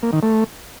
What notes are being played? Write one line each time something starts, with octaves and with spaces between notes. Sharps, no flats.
A#3
D#3
A3